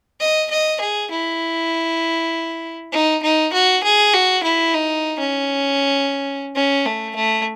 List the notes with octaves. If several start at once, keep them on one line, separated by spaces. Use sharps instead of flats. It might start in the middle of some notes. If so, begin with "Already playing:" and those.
D#5
D#5
G#4
E4
D#4
D#4
F#4
G#4
F#4
E4
D#4
C#4
C#4
A3
A3